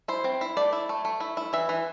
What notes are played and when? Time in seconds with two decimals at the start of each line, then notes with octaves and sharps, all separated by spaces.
0.08 E4 C5
0.24 C4
0.41 E4
0.57 A3 D5
0.73 E4
0.89 A3
1.05 A3
1.20 E4
1.37 E4
1.53 E3 E5
1.69 E3